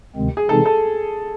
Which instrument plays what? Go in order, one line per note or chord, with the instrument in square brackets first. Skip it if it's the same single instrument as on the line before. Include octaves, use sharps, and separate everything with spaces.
[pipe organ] D2 C3 D#3 G#3 C4
[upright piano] G#4
[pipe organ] C3 E3 G#3 C4 D#4 [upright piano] A4
[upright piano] A4